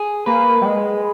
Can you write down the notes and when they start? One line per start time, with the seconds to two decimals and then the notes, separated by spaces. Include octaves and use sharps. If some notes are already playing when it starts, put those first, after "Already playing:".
Already playing: G#4
0.26 A#3 B4
0.61 G3
0.66 G#3